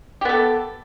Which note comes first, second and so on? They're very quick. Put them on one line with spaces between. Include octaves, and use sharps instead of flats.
G4 B3 A4